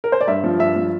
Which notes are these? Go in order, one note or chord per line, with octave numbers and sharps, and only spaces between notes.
A#4
C5
D5
G2 E5
F3
G2 E5
F3